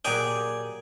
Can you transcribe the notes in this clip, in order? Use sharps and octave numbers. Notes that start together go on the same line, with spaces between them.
A#2 F#3 G4 G#4 A#4 D5 G#5 G6